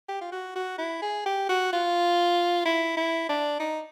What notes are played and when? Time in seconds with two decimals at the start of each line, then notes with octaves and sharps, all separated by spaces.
0.09 G4
0.21 F4
0.32 F#4
0.56 F#4
0.78 E4
1.02 G#4
1.26 G4
1.49 F#4
1.73 F4
2.66 E4
2.97 E4
3.29 D4
3.60 D#4